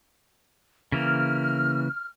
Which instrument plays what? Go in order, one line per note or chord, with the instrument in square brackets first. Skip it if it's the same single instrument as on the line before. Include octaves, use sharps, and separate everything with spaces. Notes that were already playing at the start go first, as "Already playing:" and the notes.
[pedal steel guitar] C#3 E3 A#3 [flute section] F6